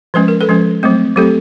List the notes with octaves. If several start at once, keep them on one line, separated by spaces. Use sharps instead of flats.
F3 G#3 C#4 B4
A#4
A4 B4
F3 G#3 C#4
F#3 A3 C4
F#3 A3 C4 G4 A4